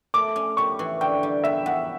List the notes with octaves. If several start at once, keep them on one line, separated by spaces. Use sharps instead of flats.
A3 D6
C#4
G4 C#6
E3
D3 G5
G3
E2 E5
E2 F#5